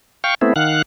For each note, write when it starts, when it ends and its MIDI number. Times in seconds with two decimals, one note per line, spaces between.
0.24 0.35 77
0.24 0.35 79
0.24 0.35 85
0.41 0.53 57
0.41 0.53 59
0.41 0.53 60
0.41 0.53 64
0.56 0.82 51
0.56 0.82 77
0.56 0.82 78
0.56 0.82 90